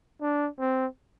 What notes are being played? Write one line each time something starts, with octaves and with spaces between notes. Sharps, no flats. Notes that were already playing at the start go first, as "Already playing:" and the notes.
D4
C4